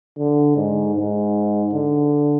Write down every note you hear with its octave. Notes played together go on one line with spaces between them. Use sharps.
D3
G#2
G#2
D3